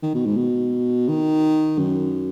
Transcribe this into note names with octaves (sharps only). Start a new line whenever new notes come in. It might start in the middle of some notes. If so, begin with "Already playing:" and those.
D#3
B2
G#2
B2
D#3
F#2